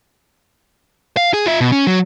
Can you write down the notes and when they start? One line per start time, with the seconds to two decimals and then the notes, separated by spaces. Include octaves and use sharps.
1.17 F5
1.34 G#4
1.46 F4 E5
1.61 B2
1.72 C#4
1.87 F#3